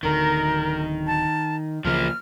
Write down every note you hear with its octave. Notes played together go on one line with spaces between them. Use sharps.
D1 D3 D#3 A#4
A5
C#2 C#3 E3 F3 A#3 F6